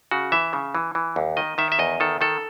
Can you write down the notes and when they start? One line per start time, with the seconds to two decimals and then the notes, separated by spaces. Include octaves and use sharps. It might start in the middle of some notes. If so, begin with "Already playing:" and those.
0.11 C#3 F#4
0.32 E3 E5
0.53 C#3
0.75 E3
0.95 E3
1.16 D#2
1.37 D#3 D#5
1.58 D#3 E5
1.72 E5
1.79 E2 D#5
2.00 D#3 A4
2.21 D#3 A4